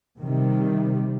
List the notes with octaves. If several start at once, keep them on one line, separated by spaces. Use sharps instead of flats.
C3 D#3 G3